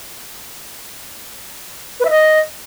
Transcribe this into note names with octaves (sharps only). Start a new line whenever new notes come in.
B4
E5
D#5